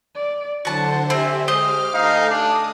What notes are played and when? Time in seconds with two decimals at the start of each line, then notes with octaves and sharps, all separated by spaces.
0.15 D5
0.65 D3 F#3 E4 F#4 C5 A5
1.10 C4 G4 E5 G#5
1.48 G#3 G4 C5 D#5 D6 F6
1.94 A3 D#4 A4 F5 G#5
2.30 D4 D#6